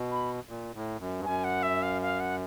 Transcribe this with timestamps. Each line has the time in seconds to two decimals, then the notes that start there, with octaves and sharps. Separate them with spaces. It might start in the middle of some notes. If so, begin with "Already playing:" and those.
Already playing: B2
0.11 B5
0.49 A#2
0.74 A2
0.99 F#2
1.19 G2
1.24 F#2 G#5
1.44 F#5
1.63 E5
1.82 F5
2.02 F5
2.20 F#5